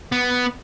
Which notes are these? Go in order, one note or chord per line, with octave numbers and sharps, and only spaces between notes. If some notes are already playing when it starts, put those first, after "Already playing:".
B3